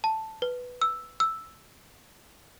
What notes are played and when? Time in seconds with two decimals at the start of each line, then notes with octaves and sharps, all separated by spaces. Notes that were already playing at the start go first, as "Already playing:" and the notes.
0.04 A5
0.42 B4
0.82 E6
1.20 E6